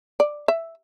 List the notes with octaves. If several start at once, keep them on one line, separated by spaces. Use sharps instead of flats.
D5
E5